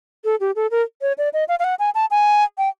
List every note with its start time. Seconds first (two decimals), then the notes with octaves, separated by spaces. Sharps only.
0.25 A4
0.40 G4
0.56 A4
0.71 A#4
1.02 C#5
1.18 D5
1.33 D#5
1.48 F5
1.59 F5
1.64 F#5
1.79 G#5
1.95 A5
2.11 G#5
2.58 G5